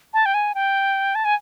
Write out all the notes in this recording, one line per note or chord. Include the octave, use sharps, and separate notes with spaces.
A5
G5
G#5
G5
A5
G#5